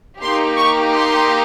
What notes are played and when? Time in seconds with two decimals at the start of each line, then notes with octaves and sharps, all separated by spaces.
0.22 A#3 D#4 G4 C6
0.58 C#6
0.92 C6